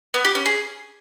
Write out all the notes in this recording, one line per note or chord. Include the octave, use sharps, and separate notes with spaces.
B3
G4
C#4
G#4